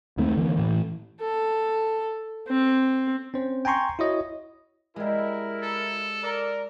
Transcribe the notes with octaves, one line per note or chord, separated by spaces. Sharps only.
D#2 D#3 A3 C4
D3 E3 A#3
A2 E3
A4
C4
C4 C#4 C5
G5 G#5 A#5 C6 C#6
E4 F#4 C#5 D#5
G3 G#3 E4 A#4
A4
A#4 D5